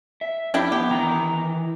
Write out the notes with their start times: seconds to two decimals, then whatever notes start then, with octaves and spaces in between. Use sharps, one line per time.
0.21 E5
0.54 F2 D4 E4 G4
0.72 B3 G4
0.90 D#3 E3 A#5